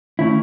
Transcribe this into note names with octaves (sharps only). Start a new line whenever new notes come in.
D#3 A3 C#4 E4